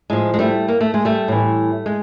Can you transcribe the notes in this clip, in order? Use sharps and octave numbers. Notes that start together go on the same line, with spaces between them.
A2 F3 G#3
G#3
G3 A3
A#3
A3
G#3
G3 A3
A2 E3
G#3